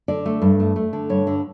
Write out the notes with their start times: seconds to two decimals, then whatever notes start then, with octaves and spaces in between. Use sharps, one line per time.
0.08 D3 D5
0.26 A3
0.42 G2
0.60 A3
0.76 A3
0.93 D3
1.10 G2 C#5
1.27 D3